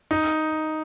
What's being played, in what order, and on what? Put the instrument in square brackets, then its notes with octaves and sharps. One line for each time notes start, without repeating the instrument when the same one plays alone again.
[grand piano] D#4